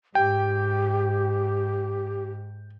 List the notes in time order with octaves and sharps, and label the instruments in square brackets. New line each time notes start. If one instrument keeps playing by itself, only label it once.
[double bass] G#2 [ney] G4 [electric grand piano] G5